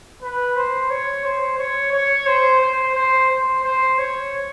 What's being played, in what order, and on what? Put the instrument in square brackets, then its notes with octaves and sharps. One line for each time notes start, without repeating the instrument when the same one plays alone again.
[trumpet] B4
C5
C#5
C5
C#5
C#5
C5
C5
C5
C5
C5
C#5